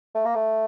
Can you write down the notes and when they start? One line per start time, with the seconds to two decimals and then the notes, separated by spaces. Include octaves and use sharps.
0.15 A3
0.25 A#3
0.35 A3